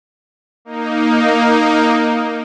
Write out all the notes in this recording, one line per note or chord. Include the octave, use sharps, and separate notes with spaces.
A#3 D#4